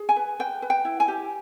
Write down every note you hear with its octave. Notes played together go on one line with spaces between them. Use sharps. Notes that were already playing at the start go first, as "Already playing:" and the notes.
Already playing: G#4
G#5
B4
B4 G5
B4
G5
E4
G#5
G4